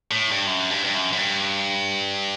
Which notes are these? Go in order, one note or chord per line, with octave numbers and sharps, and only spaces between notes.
A2
G2
F#2
G2
G2
F#2
F#2
G2